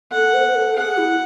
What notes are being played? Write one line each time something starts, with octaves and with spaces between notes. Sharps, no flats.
A4 F#5
C5
C5
A4
G#4 F#5
E4